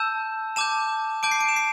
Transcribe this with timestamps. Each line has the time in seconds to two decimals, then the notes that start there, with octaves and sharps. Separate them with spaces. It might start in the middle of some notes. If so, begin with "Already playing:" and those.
Already playing: A5 E6 G6 E7
0.56 A5 D6 G6 E7
1.23 A5 D6 G6 D7
1.31 C7
1.41 D7
1.49 E7
1.56 C7